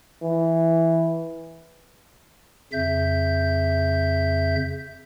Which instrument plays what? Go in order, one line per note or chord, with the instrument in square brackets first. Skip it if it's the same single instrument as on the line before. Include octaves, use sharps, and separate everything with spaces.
[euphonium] E3
[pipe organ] F2 C#3 E5 G6